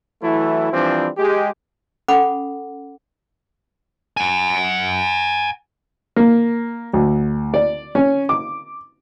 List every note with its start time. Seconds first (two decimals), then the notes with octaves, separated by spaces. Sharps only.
0.21 E3 F#3 A3 E4
0.70 E3 F3 G3 C4 D4
1.17 G#3 G4
2.08 C#4 A4 F#5 B5 D6
4.17 F#5 G#5
6.16 A#3
6.93 D2
7.54 D5
7.95 C#4
8.29 D6